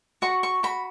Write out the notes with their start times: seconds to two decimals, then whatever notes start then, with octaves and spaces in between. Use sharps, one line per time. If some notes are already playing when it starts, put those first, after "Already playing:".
0.22 F#4 C#6
0.43 C#6
0.63 F#4 B5